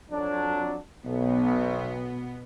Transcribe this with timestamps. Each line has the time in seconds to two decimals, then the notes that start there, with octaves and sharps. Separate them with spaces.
0.11 F2 F#3 D4
1.05 B1 B2 B3